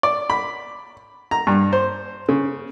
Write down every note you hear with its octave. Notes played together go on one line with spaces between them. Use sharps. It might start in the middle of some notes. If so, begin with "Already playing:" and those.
D5
B5
A#5
G2
C5
C#3